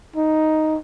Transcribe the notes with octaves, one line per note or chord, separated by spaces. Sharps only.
D#4